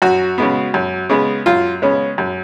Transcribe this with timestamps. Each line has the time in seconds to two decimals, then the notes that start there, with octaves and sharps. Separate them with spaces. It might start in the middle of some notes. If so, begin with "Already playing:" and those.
0.02 F#2 F#4
0.38 C#3 G#3 B3
0.74 F#2
1.09 C#3 G#3 B3
1.46 F#2 F4
1.82 C#3 G#3 B3 C#4
2.18 F#2